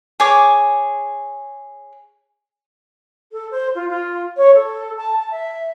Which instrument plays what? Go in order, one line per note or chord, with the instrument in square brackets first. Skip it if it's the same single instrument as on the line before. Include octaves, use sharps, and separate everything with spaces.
[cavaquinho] G#4 C#5 D6
[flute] A4
C5
F4
F4
C#5
A4
A5
A5
E5